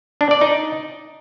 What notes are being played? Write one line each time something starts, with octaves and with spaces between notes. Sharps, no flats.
D4
D5
D#4